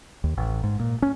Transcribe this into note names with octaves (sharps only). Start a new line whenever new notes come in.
D#2
A1
G#2
A#2
C#4